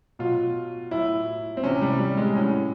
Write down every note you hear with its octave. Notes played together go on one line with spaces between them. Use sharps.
B2 F#3 F4
A2 F#3 E4
C4
C3 E3 C#4
G3
G3
G#3
A2 F#3 C#4